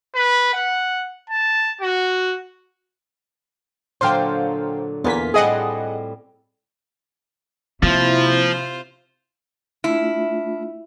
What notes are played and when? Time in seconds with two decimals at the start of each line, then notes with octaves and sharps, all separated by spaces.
0.15 B4
0.53 F#5
1.29 A5
1.81 F#4
4.01 A#2 D3 F#3 C5 F5 G5
5.04 E2 A#3 F4 G#5 B6
5.34 A2 G3 C4 G#4 D#5 F#5
7.83 C3 F3 A#3 E4 F4 C5
9.84 A3 D4 E4 F4